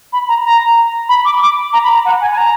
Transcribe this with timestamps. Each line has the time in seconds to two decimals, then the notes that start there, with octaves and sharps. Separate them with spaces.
0.12 B5
0.28 A#5
0.45 A#5
1.08 B5
1.25 D6
1.41 D6
1.73 A#5
1.83 B5
1.94 A#5
2.05 F#5
2.21 G#5
2.32 G#5
2.37 A#5